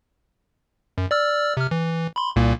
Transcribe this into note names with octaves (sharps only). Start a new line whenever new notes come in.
F#2
D5 E6 F6
C3 F6
E3
B5 C6
C2 A#2 A#3